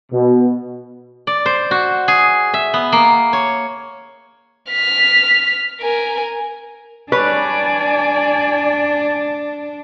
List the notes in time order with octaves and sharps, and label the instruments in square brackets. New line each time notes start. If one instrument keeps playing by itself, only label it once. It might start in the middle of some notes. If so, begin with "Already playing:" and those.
[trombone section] B2
[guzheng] D5
C5
F#4
G#4
E5
B3
A#3
C#5
[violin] F6 B6
A#4 G#5
[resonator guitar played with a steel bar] G3 B4 C#5 [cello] D4 [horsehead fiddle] D5 G#5